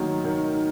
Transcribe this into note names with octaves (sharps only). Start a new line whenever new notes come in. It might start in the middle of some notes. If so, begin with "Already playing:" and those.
Already playing: D#3 F#3 A#3
D#3